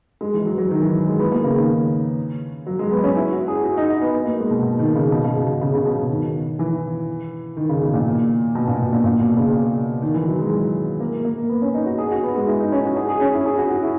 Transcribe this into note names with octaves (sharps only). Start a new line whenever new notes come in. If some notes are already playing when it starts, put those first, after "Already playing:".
G#3
E3
F#3
F#3
D#3
E3
G#3
B3
A#3
C#3
D#3
F#3
G#3
B3
C#4
E4
F#4
G#4
F#4
D#4
D#4
B3
A#3
G#3
B2
B2
D#3
C#3
B2
C#3
B2
B2
C#3
C#3
B2
B2
D#3
E3
D#3
C#3
B2
A#2
B2
A#2
B2
A#2
A#2
B2
C#3
D#3
E3
F#3
G#3
A#3
A#3
B3
C#4
D#4
F#4
G#4
F#4
B3
G#3
E4
D#4
C#4
F#4
G#4
G#4
C#4
E4
G#4
F#4
F#4
E4